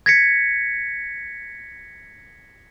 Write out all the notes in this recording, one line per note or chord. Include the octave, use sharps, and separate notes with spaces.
G#6 A#6 B6 C#7